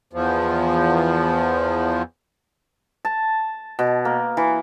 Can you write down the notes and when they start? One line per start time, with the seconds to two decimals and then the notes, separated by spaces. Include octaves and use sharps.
0.13 E2 F3
3.05 A5
3.79 B2
4.05 A#3
4.37 E3